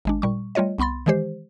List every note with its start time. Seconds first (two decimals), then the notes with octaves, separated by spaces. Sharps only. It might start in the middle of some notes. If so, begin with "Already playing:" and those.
0.05 G#1 G#3 D4
0.22 A#2 G3 C#6
0.55 G3 A3 F4 C#5 D#5
0.78 C2 B3 B5 C6 A6
1.06 D#3 E3 G#3 G4 C5